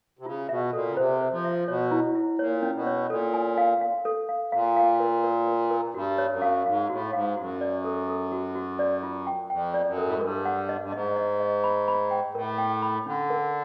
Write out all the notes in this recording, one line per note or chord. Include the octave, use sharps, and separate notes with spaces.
C3
C#3 F4
B2 E5
A#2 A4
C#3
C3 C5
C5
F3
E5
B2 C#5
E4
E4
A#2 C#5
C#4
B2
C#5
A#2 A4
G#5
F5
F5
A4
F5
A#2 F5
F5
A#4
A#4
A#4
A#4
G2 F#4
C#5
F#2
F5
G#2 F5
A2 F#4
G#2 F5
F#2 F#4
D5
A4
A4
F#4
F#4
D5
F4
G5
F2 G5
D5
F#2
A4
A2
G#2
G2 A#4
F#5
D#5
G2
G#2 D#5
D#5
D#5
B5
B5
G5
A2 A#4
G5
B5
D3 C#4
A#4